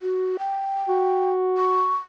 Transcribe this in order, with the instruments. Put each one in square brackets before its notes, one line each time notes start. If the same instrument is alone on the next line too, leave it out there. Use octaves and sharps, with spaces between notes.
[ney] F#4
G5
[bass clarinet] F#4
[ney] C#6